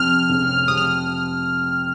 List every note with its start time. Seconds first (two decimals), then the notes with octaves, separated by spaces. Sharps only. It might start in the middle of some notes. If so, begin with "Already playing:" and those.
Already playing: F2 C3 F3 F6
0.29 F1 F2 C#3
0.67 F2 C3 F3 D#6
0.77 F6